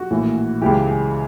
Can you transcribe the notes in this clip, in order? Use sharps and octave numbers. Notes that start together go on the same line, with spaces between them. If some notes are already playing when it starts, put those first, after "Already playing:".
Already playing: F#4
A#1 A2 E3
C#2 C#3 E3 G4
G#4